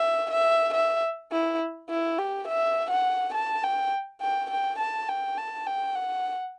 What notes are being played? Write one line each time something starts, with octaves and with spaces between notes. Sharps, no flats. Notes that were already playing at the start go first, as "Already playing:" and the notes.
Already playing: E5
E5
E5
E4
E4
G4
E5
F#5
A5
G5
G5
G5
A5
G5
A5
G5
F#5